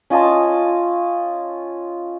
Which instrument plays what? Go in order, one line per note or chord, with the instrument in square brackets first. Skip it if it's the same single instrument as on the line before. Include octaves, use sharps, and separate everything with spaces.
[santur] C#4 F4 D#5 A5